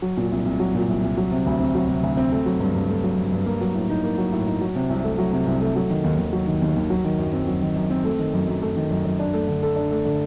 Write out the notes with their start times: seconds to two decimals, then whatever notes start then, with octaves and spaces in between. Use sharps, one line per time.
0.02 F#3
0.17 A#2
0.31 C2
0.45 C2
0.60 F#3
0.74 A#2
0.89 C2
1.03 C2
1.17 F#3
1.31 C3
1.46 D2
1.60 C4
1.75 F#3
1.89 C3
2.03 D2
2.17 C4
2.32 A3
2.46 F#3
2.60 G2
2.75 G2
2.89 A3
3.04 F#3
3.18 G2
3.32 G2
3.46 A#3
3.61 F#3
3.75 A2
3.89 D#4
4.04 A#3
4.18 F#3
4.32 A2
4.47 D#4
4.61 F#3
4.76 C3
4.90 C2
5.04 A3
5.18 F#3
5.33 C3
5.47 C2
5.61 A3
5.76 F#3
5.90 D#3
6.04 D#2
6.19 D#2
6.33 F#3
6.47 D#3
6.62 D#2
6.76 D#2
6.90 F#3
7.04 D#3
7.19 F#2
7.33 C4
7.47 F#3
7.62 D#3
7.76 F#2
7.90 C4
8.05 A3
8.19 D#3
8.33 F#2
8.48 F#2
8.62 A3
8.76 D#3
8.91 F#2
9.05 F#2
9.19 D4
9.34 A3
9.48 D3
9.63 A4
9.76 D4
9.91 A3
10.05 D3